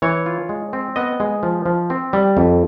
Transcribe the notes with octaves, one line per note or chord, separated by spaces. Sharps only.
E3 C#5
F4
G#3
C4
B3 D#5
G#3
F3
F3
C4
G3
F2